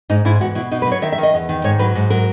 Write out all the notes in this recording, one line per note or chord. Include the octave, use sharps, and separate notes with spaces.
G#2 D#4
G#2 E4
E2 F#4
B2 E4
B2 D#4
B4
F#3
C#5
D#3 E5
E5
D#3
D#5
E2
D#3
G#2 C#5
F#3 B4
G#2
F#3 A#4